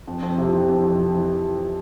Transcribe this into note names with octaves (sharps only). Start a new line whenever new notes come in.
F2
F2
C3
E3
F2
F2
C3
E3